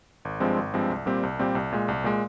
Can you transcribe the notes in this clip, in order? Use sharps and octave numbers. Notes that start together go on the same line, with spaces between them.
G#1
G2 F3 G#3 C4
G#1
G2 F3 G#3 C4
C2
A#2 G3 C4 G4
C2
A#2 G3 C4 G4
C2
A#2 G#3
C2
A#2 G#3